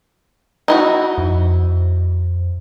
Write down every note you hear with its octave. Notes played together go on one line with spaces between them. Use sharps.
D#4 E4 F#4
F2